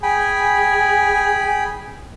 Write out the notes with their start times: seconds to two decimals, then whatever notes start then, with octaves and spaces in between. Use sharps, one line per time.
0.03 G#4 G5 G#5 B5